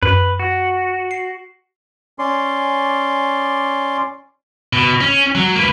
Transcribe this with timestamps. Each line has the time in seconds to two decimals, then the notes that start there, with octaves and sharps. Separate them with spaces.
0.03 F#2 B4
0.39 F#4
1.11 C7
2.19 C#4 D5 C6
4.73 B2
5.01 C#4
5.35 F#3
5.56 A#3 B4